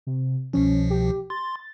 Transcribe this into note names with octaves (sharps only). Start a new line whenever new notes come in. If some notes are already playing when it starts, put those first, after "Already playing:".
C3
C2 B2 F3 C#4
G4
C6 A6